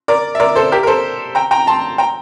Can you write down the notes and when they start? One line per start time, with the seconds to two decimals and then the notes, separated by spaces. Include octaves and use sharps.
0.08 A#4 D5
0.35 E5
0.40 A#4 D5
0.55 A4 C5
0.72 G4 A#4
0.83 A#4
0.87 A4 C5
1.35 G5 A#5
1.51 G5 A#5
1.67 A5 C6
1.98 G5 A#5